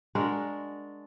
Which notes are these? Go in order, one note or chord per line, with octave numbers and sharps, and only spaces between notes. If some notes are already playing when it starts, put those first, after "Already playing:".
G#3 D4 F#4 A#4